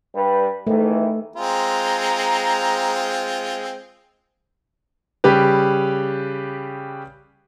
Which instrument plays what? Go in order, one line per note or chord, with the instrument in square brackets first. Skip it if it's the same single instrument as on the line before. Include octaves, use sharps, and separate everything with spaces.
[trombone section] G2 G3 B4
[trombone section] G#2 D#3 E3 [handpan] A3
[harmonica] G#3 C4 F4 [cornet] A#5
[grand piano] C#3 G3 G4 B4